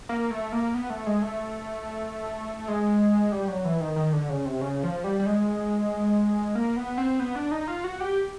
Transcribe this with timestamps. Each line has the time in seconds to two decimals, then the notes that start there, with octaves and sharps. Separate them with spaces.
0.09 A#3
0.31 A3
0.52 A#3
0.74 B3
0.90 A3
1.07 G#3
1.22 A3
2.68 G#3
3.32 G3
3.48 F#3
3.65 E3
3.81 D#3
3.96 D#3
4.13 D3
4.29 C#3
4.46 C3
4.61 C#3
4.83 F3
5.04 G3
5.19 G3
5.26 G#3
6.55 A#3
6.76 B3
6.98 C4
7.20 B3
7.36 D4
7.51 D#4
7.68 F4
7.84 F#4
8.00 G4